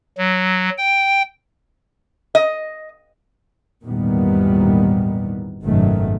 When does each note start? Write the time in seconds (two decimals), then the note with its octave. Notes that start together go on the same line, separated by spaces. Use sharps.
0.18 F#3
0.78 G5
2.35 D#5
3.86 G#1 E2 A#2 D#3 G3 B3
5.64 G#1 F#2 B2 D#3 F#3 A3